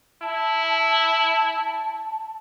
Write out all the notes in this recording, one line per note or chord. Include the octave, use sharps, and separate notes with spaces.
E4 A5